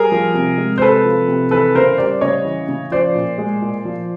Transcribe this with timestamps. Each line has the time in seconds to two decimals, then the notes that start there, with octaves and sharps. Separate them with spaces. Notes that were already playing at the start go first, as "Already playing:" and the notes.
Already playing: G3 G#4 A#4
0.12 F3
0.34 C3
0.58 G#3
0.78 C5
0.81 C3 A4 B4
1.05 F3
1.28 C3
1.51 E3 A4 B4
1.75 C#3 A#4 C5
1.98 G3 C5 D5
2.21 C#3 C#5 D#5
2.45 E3
2.69 C#3
2.91 F3 C5 D5
3.15 A#2
3.38 G#3
3.62 A#2
3.85 F3